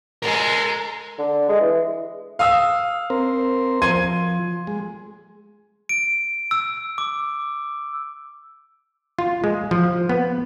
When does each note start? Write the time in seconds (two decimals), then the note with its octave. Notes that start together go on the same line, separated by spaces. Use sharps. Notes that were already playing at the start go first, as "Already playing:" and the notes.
0.23 G#3 A4 A#4
1.19 D3
1.49 G#3
1.61 E3
2.39 F5 D#6 E6
3.10 C4 A#4 C5
3.82 F3 C6 G#6 D#7
4.67 G#3
5.89 D7
6.51 E6
6.98 D6
9.19 F4
9.44 G#3
9.71 F3
10.09 B3